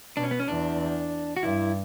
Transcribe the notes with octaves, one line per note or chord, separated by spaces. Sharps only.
B2 D4
C#4
B3
C#4
E2 D4
F#4
G2 E4